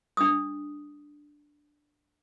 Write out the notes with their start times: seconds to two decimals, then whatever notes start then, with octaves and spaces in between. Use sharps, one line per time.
0.17 D4 D#6